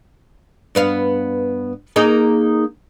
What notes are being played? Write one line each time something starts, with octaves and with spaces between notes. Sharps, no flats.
G2 B3 F5
A#3 D#4 G#4